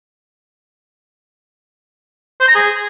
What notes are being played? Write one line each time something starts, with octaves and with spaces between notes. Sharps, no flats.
C5
A#5
G#4